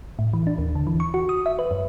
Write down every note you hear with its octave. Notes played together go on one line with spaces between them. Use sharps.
A2
E3
D4
D#2
D3
E3
C#6
F#4
D#6
E5
B4
F#2